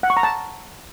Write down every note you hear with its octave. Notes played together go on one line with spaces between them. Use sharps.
F#5
C#6
A#5
A5